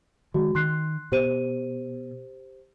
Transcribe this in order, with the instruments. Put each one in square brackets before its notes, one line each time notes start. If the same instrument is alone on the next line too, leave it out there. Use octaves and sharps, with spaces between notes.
[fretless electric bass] D#3 G#3 [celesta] F#4
[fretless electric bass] D#3 [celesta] C6 F#6 C7
[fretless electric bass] B2 [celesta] G4 C5 D#7